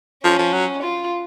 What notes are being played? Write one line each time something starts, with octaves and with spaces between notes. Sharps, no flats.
F3 C#4
F3
F#3
F4